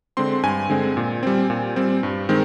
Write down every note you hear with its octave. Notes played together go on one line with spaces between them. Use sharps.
D3 G#3 C4 C6
G2 G#5
D3 G#3 C4
A#2
G3 C4
A#2
G3 C4
G2
D#3 G#3 C4